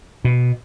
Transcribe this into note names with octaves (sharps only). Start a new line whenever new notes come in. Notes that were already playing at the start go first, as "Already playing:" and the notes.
B2